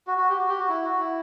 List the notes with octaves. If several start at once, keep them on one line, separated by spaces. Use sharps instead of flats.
F#4
F#4
G4
F#4
G4
F#4
E4
F#4
E4